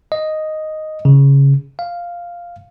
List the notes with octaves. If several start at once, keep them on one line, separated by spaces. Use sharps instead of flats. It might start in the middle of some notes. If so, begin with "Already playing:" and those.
D#5
C#3
F5